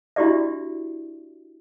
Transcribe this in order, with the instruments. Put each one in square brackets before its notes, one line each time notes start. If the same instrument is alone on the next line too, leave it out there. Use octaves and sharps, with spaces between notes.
[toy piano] D4 E4 F#4 G4 D5 E5